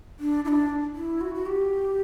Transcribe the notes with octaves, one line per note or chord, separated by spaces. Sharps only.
D4
E4
D4
E4
F#4
F#4
G4